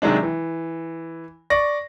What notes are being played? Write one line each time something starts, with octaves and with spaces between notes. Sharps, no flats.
C3 D#3 F#3 G#3 D4
E3
D5 C#6 A#6